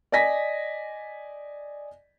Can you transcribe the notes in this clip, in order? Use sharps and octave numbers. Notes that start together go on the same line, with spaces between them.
D5 D#5 G#5 A#6 B6